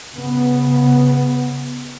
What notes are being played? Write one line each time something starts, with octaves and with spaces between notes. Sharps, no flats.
C#3 B3